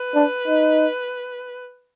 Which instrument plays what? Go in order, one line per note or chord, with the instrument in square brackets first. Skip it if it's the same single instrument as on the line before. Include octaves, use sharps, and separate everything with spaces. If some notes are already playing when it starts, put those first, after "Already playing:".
Already playing: [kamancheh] B4
[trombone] D4
D#4